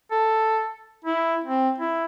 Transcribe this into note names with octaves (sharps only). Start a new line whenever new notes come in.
A4
E4
C4
E4